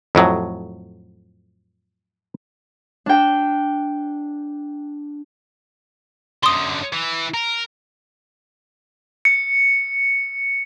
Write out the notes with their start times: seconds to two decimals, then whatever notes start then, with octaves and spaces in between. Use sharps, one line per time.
0.15 F2 A2 F#3
3.06 D4 G5
6.43 F#2 D3 C6 D#6
6.93 E3
7.34 A#4
9.25 C#7